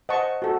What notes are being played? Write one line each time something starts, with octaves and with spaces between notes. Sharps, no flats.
C5 D#5 F#5 A5 C#6
F#4 A4